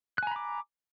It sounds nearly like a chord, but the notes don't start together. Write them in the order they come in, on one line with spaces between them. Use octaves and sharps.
F#6 G#5 A#5 B5 D6